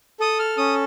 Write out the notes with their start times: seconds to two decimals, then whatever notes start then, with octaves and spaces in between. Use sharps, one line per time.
0.20 A4 D#6
0.39 F6
0.58 C#4 D#6